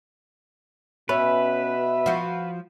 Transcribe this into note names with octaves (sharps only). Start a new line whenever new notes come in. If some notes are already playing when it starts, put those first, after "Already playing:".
B2 C#4 B4 E5
F3 F#4